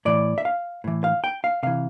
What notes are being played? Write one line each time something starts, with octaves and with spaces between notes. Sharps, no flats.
A2 E3 D5
E5
F5
A2 E3
F5
G5
F5
C3 E3 F5